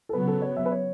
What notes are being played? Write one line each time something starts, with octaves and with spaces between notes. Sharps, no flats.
A4
C#3 F#3 B3 B4
A4
C#5
E5
B4
C#5